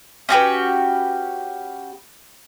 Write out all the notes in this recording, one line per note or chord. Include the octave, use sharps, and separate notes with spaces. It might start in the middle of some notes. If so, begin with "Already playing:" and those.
C#4 F#4 G4 B4